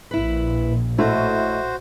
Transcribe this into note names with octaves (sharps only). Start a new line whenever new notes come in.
A#1 A#2 E4 B4
A2 A3 F#4 C5 D#5